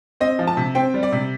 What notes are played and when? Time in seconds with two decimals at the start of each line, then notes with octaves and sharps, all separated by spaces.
0.20 C4 D#5
0.39 F3
0.47 A5
0.57 C3
0.75 C4 G5
0.94 G3
1.03 D5
1.12 C3